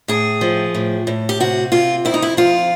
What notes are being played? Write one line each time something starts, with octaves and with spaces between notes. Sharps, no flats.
A2 G#4
F3
A2
A2
G4
C3 F#4
C3 F4
F2 E4
D#4
E4
F3 F4